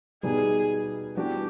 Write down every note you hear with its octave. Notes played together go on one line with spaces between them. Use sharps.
B2 G3 B3 D#4 G#4
E3 G3 B3 D4 F#4 G4